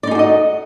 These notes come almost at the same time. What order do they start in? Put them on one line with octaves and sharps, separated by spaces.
D5 D#4 G#4 F#4 D#5